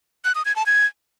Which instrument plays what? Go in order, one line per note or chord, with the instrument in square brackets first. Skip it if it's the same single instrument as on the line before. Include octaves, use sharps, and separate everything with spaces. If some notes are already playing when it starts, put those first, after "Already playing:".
[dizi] F#6
D#6
G#6
A5
G#6